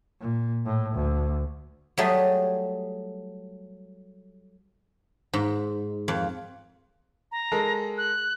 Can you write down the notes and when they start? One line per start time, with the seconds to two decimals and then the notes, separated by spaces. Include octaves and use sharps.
0.21 A#2
0.65 A2
0.95 D2
1.97 F#3 G3 A3 G#4
5.33 G#2
6.08 F2
7.32 A#5
7.52 G#3 A4 A#4
7.98 F#6